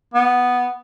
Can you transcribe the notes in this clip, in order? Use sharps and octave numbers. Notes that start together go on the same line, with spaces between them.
B3